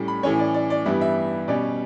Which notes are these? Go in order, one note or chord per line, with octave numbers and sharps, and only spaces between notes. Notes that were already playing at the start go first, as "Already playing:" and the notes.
Already playing: A2 G3 C#4
B5
A2 E3 A3 C#4 C#5
D5
D5
D5
G2 E3 G3 B3 E5
E5
B2 G3 C#4 D5